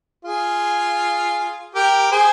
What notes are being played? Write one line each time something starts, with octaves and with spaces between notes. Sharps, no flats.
F4 G#4
G4 A#4
G#4 C5